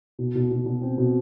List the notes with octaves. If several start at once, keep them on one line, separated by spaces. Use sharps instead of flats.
B2
B2
B2
B2
C4
B2